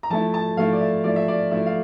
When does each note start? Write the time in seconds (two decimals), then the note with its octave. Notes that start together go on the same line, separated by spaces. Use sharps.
0.03 A#5
0.10 F3 A3 E4 A5
0.34 A5
0.57 F3 A3 E4 F5
0.73 D5
0.81 E5
1.04 F3 A3 E4 D5
1.16 E5
1.28 D5
1.51 F3 A3 E4 E5
1.66 F5